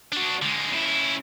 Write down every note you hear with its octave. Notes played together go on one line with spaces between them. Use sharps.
D4 F#4
D3 G#3
C#3 E4